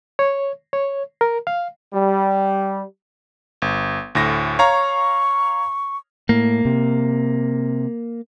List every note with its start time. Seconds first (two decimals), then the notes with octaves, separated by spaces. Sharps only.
0.19 C#5
0.73 C#5
1.21 A#4
1.47 F5
1.93 G3
3.62 G1
4.15 D2 A2 A#6
4.59 C#5 F5 A#5 C#6
6.29 A2 A#3
6.65 C3